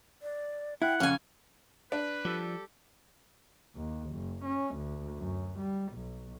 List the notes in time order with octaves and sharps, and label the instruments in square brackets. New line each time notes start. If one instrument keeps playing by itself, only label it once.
[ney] D5
[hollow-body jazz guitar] E4 [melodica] F#5 [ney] G5
[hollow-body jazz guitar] F2 C#3 [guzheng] C#4 G#5 [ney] F5
[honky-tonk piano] D4 [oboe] B4
[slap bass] F3 [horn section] G3 G4 A4
[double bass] D#2
F#1
C#4
D2
F#2
G3
B1